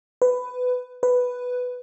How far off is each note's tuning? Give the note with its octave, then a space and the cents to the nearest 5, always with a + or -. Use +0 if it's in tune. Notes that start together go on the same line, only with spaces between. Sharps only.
B4 +15
B4 +5